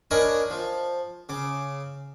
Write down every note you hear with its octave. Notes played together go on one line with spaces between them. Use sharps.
D4 A#4 C#5 D#5 G#5 B5
F3
C#3 D6